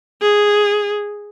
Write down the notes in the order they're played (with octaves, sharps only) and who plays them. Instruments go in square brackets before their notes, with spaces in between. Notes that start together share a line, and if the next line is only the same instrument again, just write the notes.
[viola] G#4